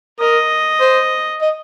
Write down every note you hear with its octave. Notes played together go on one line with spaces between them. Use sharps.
A#4 D#5
C5
D#5